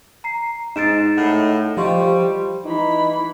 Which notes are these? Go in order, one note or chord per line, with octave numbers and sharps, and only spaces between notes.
A#5 C7
G#2 D#4 A6 D7 E7
A2 F#5
F3 G3 D#5 C6 C#6
E3 D#4 B5